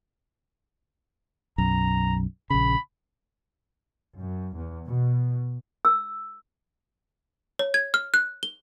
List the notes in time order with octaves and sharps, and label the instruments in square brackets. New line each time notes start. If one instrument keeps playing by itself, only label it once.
[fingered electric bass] B1 F#2 [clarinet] A#5
[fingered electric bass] A#1 C#3 [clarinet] B5
[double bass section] F#2
E2
B2
[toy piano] E6
[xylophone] C#5
G#6
F6
F#6
G7